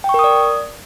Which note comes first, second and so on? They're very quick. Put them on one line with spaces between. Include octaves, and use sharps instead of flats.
G5 C#6 A#4 D#6 D5